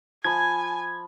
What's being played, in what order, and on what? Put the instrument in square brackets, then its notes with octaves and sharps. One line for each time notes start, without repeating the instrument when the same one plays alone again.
[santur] F3 B5 [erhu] G#5 [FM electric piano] G#6